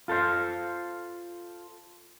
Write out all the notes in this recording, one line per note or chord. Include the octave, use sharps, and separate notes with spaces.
F4 A4 A#4 C5 F5